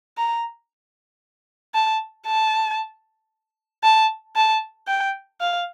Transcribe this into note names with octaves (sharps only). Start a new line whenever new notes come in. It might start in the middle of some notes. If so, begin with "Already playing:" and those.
A#5
A5
A5
A5
A5
G5
F5